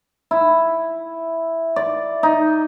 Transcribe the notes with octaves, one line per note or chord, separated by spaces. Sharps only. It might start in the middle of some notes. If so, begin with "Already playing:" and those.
E4
D5
D#4